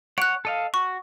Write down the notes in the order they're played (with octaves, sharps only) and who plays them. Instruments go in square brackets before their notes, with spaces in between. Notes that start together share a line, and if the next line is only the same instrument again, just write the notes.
[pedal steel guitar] C#5 F#5 [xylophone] F#6 D7
[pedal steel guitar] A4 D#5 F5
[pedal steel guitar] F#4 [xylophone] C#6